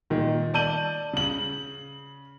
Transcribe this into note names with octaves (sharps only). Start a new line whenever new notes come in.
A#2 D#3
D5 A5 G6 D#7 F#7
C#3 F#7